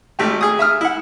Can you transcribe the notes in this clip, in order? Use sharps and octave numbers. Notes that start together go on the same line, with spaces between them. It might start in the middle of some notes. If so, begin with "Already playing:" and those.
G#1 A3 G4
G#4 D#6
E5 D#6 F6
E4 F#5